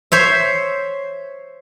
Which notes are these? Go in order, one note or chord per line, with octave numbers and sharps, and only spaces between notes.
C5 C#5 E5